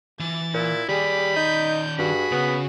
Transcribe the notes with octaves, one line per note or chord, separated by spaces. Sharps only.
E3 A6
A#2 E4
D#3 G3 G4 G#4 D5 B5
D#4 G6
G2 F#4 G#4 B5
C#3 B3